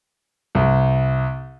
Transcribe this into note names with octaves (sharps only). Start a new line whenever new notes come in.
C2